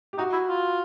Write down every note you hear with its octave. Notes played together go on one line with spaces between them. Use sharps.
G4
D#4 F#4
E4
F4